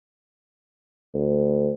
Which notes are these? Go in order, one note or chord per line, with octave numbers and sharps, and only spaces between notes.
D2